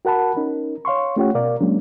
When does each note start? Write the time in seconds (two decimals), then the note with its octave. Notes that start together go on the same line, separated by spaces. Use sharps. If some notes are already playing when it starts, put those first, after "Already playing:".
0.05 F#4 A#4 F#5 A5 B5
0.37 C#4 D#4 A#4
0.85 C#5 F5 C6 C#6
1.16 A3 C#4 F4 G4 C#5 F#5
1.35 B2 A#4 D5 F5
1.60 F#3 G#3 A#3 C#4 D4